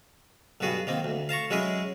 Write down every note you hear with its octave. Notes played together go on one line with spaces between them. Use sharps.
B1 G2 B3 F#4 G#4
D#3 A#3 C4
D2
F5 A5 A#5 C#6
F#3 G#3 C#4 E4 G#4